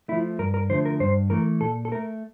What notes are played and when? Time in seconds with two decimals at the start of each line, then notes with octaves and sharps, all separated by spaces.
0.08 F3 A3 E4
0.39 G2 A#4
0.54 A#4
0.70 D3 F3 A3 C5
0.85 A#4
1.00 G2 C5
1.30 E3 A3 A#4
1.61 A#2 A4
1.85 A4
1.92 A3 A#4